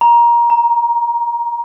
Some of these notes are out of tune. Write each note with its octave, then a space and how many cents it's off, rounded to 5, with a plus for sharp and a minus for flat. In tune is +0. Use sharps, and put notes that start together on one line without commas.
A#5 +20
A#5 -10